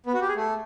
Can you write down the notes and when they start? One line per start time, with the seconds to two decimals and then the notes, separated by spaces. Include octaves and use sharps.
0.06 B3
0.14 F#4
0.21 G4
0.28 G#4
0.36 A3